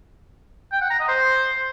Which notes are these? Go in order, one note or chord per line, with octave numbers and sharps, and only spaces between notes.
G5
F#5
A#5
D#5
C5